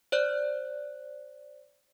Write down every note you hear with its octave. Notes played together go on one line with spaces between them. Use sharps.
C5 D5 F#6